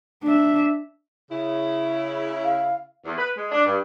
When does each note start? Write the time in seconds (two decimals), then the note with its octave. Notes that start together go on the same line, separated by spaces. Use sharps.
0.24 D4 E5
1.31 C#3 E4
2.45 F5
3.05 E2
3.17 B4
3.35 G#3
3.52 D4
3.65 G2